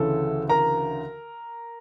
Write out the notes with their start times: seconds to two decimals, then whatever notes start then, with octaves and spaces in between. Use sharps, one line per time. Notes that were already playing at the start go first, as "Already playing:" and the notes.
Already playing: D2 C#3 E3 A4
0.49 A#4 A#5